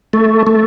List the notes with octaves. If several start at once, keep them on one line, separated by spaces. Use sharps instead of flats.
A3
A3